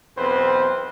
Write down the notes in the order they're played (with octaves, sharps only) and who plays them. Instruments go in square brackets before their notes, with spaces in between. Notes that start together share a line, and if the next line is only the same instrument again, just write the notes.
[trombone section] B1 E2 C4 B4 C5